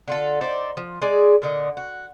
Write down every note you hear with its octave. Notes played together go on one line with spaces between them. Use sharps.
D3 F4 A4
D#4 C5 D5 E5
F3
G#3 G#4 D5
A#2 D3 D#5
F#4